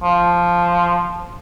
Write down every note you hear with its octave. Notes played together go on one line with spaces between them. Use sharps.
F3